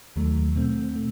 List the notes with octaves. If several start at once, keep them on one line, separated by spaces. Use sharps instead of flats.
D#2 D#3 F#3 A3
B2 A3 C4
A3